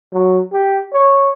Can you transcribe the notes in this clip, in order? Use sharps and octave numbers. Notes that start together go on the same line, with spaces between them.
F#3
G4
C#5